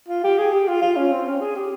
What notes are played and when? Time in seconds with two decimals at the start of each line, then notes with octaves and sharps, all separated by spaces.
0.08 F4
0.24 G4
0.38 G#4
0.53 G4
0.67 F4
0.82 F4
0.96 C#4
1.12 C4
1.26 C#4
1.40 G#4
1.56 G4